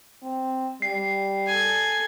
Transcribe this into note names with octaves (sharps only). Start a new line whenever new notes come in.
C4
G3 C7
A4 G#5